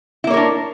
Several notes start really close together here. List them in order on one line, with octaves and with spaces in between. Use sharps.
E4 A#3 C#5 A#4 D4